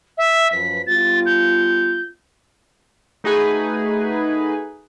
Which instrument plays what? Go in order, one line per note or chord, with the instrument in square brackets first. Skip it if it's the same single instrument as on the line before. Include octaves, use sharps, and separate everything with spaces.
[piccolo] E5
[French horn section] F#2 F3 B4 [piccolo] B6
[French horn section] G3 B3 F4 [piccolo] A6
[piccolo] G6
[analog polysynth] A3 D#4 F#4 G#4 B4 G#5